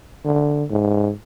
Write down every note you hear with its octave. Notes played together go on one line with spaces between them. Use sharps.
D3
G#2